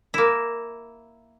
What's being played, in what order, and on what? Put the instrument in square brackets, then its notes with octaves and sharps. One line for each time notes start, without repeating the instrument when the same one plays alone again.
[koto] A#3 E4